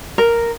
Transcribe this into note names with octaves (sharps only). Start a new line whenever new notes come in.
A#4